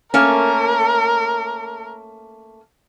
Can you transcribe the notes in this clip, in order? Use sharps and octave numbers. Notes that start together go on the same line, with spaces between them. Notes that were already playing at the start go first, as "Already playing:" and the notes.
A3 A#3 C#4 A#4